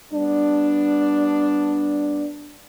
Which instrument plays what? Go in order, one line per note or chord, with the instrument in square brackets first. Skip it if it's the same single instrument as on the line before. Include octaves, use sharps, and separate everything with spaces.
[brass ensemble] G3 B3 D4